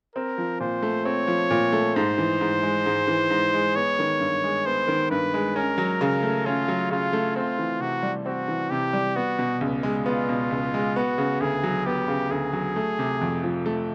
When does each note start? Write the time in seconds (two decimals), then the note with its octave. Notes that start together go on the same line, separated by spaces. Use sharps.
0.15 C4 A#4
0.38 F3
0.60 A#2 C5
0.82 A3
1.05 C4 C#5
1.28 F3
1.51 A#2
1.73 A3
1.95 G#2 C5
2.18 E3
2.41 G#2
2.63 G#3
2.86 G#2
3.08 E3
3.30 G#2
3.54 G#3
3.75 B3 C#5
3.99 D#3
4.20 G2
4.43 G#3
4.65 B3 C5
4.88 D#3
5.10 G2 B4
5.34 G#3
5.56 C#4 A#4
5.78 F#3
6.01 C#3
6.23 A3
6.45 C#4 F4
6.68 F#3
6.90 C#3 F4
7.13 A3
7.36 C4 F4
7.58 E3
7.80 C3 F#4
8.03 G3
8.26 C4 F#4
8.48 E3
8.70 C3 G4
8.93 G3
9.16 B3 F#4
9.39 B2
9.61 C#2
9.83 G#3
10.06 B3 F4
10.29 B2
10.51 C#2
10.74 G#3
10.96 B3 F#4
11.18 C#3
11.40 D2 G#4
11.64 F#3
11.86 B3 G4
12.08 C#3
12.31 D2 G#4
12.53 F#3
12.76 A3
12.99 C3
13.21 F2
13.43 F3
13.66 A3